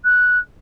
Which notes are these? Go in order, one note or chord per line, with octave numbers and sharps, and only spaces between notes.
F#6